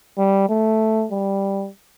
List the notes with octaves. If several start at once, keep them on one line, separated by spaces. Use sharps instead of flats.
G3
A3
G3